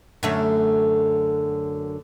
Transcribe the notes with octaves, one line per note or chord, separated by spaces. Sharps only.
F#2 D3 A3